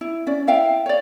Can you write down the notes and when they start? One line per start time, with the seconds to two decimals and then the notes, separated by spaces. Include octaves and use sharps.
0.01 E4
0.27 C#4 D5
0.47 E4 E5 F5 G5
0.86 C#5 D5